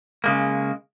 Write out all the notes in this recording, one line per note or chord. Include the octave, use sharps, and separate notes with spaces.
C#3 G#3 A#3